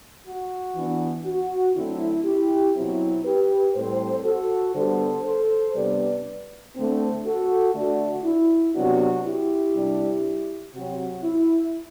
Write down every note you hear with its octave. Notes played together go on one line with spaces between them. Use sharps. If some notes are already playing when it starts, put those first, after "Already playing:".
F#4
E3 B3 D4
F#4
D3 F#3 A3 C4 E4
E4 G4
B2 F#3 C4 E4
G4 B4
A2 G3 C4 A4 C5
F#4 A4
D3 G3 B3 A4 C5
A4 C5
C3 G3 B3 D4 B4 D5
D3 A3 C4
F#4 A4
D3 A3 D4 F#4
E4
C3 F#3 B3 D4 F#4
E4 G4
C3 G3 D4
C3 F#3 C4 F#4
E4